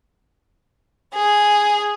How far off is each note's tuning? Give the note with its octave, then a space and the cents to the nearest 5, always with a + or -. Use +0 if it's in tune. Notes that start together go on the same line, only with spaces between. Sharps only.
G#4 +0